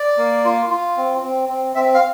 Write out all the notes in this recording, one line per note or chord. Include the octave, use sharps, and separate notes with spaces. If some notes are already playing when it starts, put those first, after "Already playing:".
Already playing: D5
A#3
F4
F4
C4
C4
C4
C4 E5
F5